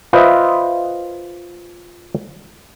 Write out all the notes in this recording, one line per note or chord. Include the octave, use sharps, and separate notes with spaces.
F4 B4 C5 D#5 E5